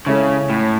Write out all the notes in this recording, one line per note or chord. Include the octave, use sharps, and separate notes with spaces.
C#3 G#3 C#4 E4 A4 C#5
A2